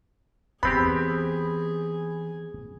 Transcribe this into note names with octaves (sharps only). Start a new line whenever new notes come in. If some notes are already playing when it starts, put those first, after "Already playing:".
E2 E3 B3 C4 G4 G#4 B5